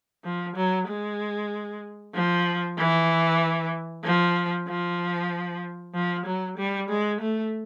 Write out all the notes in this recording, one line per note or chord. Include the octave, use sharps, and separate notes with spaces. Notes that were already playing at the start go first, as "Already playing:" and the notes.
F3
F#3
G#3
F3
E3
F3
F3
F3
F#3
G3
G#3
A3